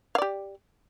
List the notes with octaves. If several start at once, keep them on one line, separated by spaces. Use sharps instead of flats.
G4 D5 F5